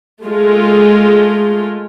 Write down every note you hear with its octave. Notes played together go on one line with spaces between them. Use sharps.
G#3 A3 F4